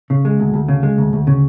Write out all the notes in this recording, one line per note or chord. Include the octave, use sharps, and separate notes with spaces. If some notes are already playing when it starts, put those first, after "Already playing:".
C#3
G#3
D2
D2
C#3
G#3
D2
D2
C#3